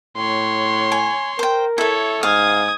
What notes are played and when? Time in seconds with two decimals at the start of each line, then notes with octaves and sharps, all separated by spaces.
0.17 A2 C#5 C6
0.92 G#5
1.39 A#4 C5 G5
1.78 E4 A4 C#5 E5
2.23 G#2 F5 D#6 G#6